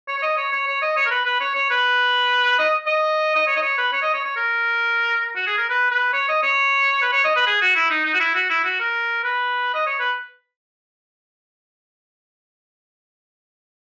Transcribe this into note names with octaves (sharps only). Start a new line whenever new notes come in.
C#5
C#5
D#5
C#5
C#5
C#5
D#5
C#5
A#4
B4
B4
C#5
C#5
B4
D#5
D#5
D#5
C#5
D#5
C#5
B4
C#5
D#5
C#5
C#5
A#4
F#4
G#4
A#4
B4
B4
C#5
D#5
C#5
B4
C#5
D#5
B4
G#4
F#4
E4
D#4
D#4
F#4
E4
F#4
E4
F#4
A#4
B4
D#5
C#5
B4